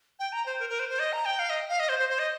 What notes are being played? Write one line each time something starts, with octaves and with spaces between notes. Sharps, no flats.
G5
A#5
C5
A#4
A#4
C5
C5
D#5
A#5
G5
F5
D#5
F5
D#5
C5
C5
C5
D#5